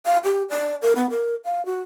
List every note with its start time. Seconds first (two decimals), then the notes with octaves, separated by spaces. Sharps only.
0.06 F5
0.24 G4
0.50 D5
0.82 A#4
0.96 B3
1.10 A#4
1.45 F5
1.66 F#4